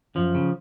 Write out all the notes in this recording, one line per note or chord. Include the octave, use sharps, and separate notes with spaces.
F#2 F3
C#3